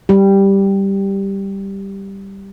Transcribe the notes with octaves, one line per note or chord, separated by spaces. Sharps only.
G3 G4